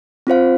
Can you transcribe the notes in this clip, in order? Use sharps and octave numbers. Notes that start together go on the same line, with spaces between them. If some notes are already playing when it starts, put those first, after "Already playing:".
C4 F4 C5 F5